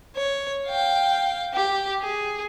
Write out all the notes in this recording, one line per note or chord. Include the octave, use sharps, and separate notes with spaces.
C#5
F5 G5
G4
G#4